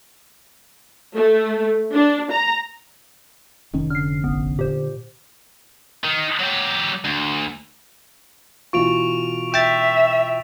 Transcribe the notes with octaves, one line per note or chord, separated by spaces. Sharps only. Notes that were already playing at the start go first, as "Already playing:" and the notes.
A3
D4
A#5
F1 D#3 C#4
D3 F6 C7
A1 B3
A#2 G4 C5
D#3
F#3 G4
D2
B2 E3 F4 C#6 D7 F7
E5 G5 A6 E7 F7